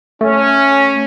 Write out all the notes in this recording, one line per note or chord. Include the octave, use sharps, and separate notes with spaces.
A3 C#4